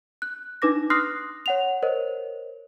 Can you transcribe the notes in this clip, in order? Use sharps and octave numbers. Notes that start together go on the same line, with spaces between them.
F#6
D4 D#4 B4 D6 A#6
C6 D#6 F6 F#6 A#6 C7
C#5 F#5 F7
A#4 C5 C#5 D#5